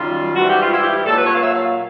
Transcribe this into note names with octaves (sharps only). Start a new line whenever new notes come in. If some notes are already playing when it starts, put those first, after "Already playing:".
Already playing: F#2 D#3 G3 F4
G#2 E3 G3 F#4
G4
F4
E4
G4
A#2 F#3 A4
B4
C#5
F5
E5
F5